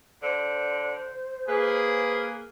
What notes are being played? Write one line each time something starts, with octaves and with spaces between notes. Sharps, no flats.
D3 C5
A#3 G#4 B4